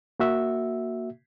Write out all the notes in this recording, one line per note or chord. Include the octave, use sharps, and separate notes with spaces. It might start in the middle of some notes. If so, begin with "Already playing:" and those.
A#3 F#4 E5